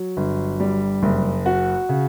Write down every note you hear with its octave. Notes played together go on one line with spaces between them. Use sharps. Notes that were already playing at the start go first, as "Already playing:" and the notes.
Already playing: F#3
G1
G3
F#1
F#4
C#3